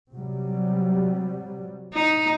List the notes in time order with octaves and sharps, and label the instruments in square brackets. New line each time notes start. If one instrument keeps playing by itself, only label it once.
[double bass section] C3 F#3 G3
[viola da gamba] D#4